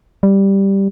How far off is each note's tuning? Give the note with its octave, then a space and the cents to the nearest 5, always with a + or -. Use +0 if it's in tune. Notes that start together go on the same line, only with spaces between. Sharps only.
G3 +0